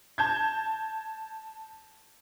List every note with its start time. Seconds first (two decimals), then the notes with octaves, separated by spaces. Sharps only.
0.18 A5 G6 G#6